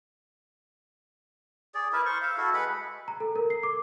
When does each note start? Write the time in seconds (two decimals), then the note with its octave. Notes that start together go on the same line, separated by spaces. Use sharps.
1.74 G#4 D5
1.93 E4 A#4 B4 E5
2.06 C5 C#6
2.22 E5 F5
2.38 E4 F#4 A4
2.54 G#3 B4 F#5 B5
3.08 A#5
3.20 A4
3.36 A#4
3.50 C7
3.63 D6